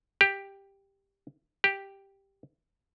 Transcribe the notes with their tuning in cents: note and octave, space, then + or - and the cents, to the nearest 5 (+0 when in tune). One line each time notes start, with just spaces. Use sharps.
G4 +5
G4 +0